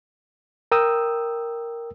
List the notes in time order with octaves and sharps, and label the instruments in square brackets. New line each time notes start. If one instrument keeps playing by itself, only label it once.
[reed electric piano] A#4 G5 D#6 E6